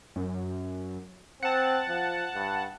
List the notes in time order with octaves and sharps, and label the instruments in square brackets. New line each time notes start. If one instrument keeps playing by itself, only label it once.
[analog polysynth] F#2
[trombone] C4 [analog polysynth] F#5 A5
[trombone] F3
G2